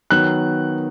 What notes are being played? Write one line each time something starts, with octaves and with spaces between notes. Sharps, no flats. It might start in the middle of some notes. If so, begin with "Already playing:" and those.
D#3 F#3 B3 F#6